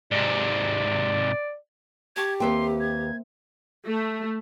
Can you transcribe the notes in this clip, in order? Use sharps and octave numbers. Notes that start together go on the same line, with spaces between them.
G#2 C3 D5
G4 G5 A5 C#6 G#6
D#2 A#3 C4 B4 E5 G5 C6
G#6
A3